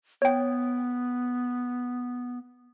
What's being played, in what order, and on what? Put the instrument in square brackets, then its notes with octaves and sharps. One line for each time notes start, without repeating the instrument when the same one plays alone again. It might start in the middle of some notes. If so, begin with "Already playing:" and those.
[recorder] B3 [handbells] C#5 G5